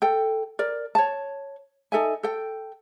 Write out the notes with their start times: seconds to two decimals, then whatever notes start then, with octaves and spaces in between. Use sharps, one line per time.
0.02 A4 G5
0.59 A#4 D5
0.95 C#5 A5
1.92 D#4 A4 E5 G#5
2.23 A4 G5